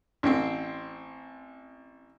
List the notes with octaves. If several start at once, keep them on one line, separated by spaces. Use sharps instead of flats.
A1 C4